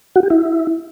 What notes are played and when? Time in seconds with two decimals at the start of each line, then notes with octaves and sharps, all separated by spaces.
0.16 F#4
0.23 G4
0.30 E4